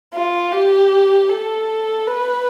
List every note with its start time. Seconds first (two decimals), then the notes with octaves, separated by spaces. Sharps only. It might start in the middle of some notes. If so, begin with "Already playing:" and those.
0.14 F4
0.52 G4
1.29 A4
2.06 B4